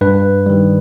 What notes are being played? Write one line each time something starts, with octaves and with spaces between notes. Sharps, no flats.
G2 B4
D#3 G3